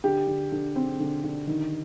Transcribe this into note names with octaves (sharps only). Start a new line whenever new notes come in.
D3 G4
D3
D3
C4
D3
D3
D#3